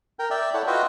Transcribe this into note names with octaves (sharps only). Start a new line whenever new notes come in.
A#4 G5
D5 E5 G5
E4 A4 C#5 D5 F#5
F4 F#4 B4 D#5 E5 G5